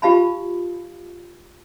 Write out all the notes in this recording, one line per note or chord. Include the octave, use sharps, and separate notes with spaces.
F4 G4 F5 A5 B5